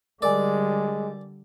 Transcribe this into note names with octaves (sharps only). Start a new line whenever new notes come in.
D3 G3 G#3 A#4 D5 G#5